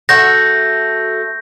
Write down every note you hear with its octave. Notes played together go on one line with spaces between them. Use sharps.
A3 F#4 E5 G6 A#6